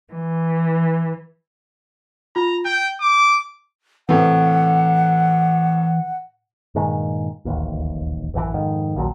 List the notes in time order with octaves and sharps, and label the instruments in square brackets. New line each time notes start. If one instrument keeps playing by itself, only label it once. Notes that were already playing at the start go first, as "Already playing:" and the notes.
[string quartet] E3
[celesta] F4 [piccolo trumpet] A#5
[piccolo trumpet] G5 [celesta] G6
[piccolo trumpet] D6
[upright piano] A2 C3 [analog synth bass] E3 [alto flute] F#5
[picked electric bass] G2 A#2 D#3 G#3
D1 A1 D#2
A1 F#2 D3 E3
F2 G#2 D#3
A#1 D#2 A#2 F#3